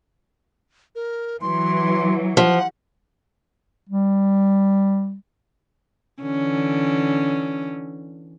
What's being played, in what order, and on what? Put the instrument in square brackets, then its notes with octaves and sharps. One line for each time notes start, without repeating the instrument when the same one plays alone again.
[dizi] A#4
[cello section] E3 F#3 [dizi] C6
[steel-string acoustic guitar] F3 [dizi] F#5
[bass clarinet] G3
[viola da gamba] D3 E3 C#4